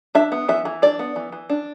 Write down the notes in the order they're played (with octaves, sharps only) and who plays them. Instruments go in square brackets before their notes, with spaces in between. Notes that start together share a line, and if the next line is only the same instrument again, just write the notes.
[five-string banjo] D4 E5
B3
E3 E5
E3
D4 D5
B3
E3
E3
D4